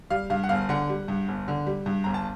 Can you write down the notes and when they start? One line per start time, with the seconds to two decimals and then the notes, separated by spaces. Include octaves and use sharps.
0.10 G3 F5
0.30 G2 F5
0.43 F#5
0.49 G1 F5
0.69 D3 F#5
0.89 G3
1.08 G2
1.28 G1
1.48 D3
1.66 G3
1.86 G2
2.04 G1 A#5
2.14 A5